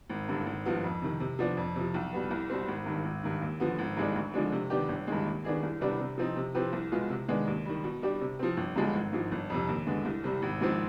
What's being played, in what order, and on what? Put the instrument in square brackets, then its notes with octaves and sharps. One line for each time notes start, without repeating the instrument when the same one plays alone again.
[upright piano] G#1
G2 D3
G#1
G2 F3 B3
F2
C3 D#3
C3
F3 B3 D4
F2
C3 F3
B1
B2 G3 B3
C2
B2 G3 C4
G#1
G2 D#3
G#1
G2 D#3
D#2
D3 F3 B3
G#1
G2 D#3 G#3 D4
D2
D3 F3 G#3 D4
C3
D#3 B3 D4 G4
G1
G2 D#3 G#3
D#2
D#3 B3 D4 G#4
C2
C3 G3 B3 D4
C3
F3 C4 D#4
C3
F3 C4 G4 B4
C2
B2 G#3 B3 F4
C3
D#3 G#3 B3 D4
D#2
D#3 G3
B2
G3 D4 G4
C3
F3 C4
G1
G2 D3 F3 G#3
G#1
G#2 F3
G1
F2 C3
D#2
D3 G#3 B3
C2
C3 G3
G#1
G#2 F3 C4